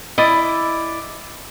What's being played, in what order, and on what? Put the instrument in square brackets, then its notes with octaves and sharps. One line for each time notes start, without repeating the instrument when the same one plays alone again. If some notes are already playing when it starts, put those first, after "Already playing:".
[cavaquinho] E4 D5 [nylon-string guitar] D#5